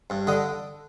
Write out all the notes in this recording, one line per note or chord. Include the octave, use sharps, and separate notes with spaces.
G2
D3 D#5